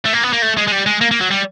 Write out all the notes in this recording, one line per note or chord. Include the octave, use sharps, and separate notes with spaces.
A3
A#3
B3
A#3
A3
G#3
G#3
G3
G#3
A#3
A#3
F#3
G3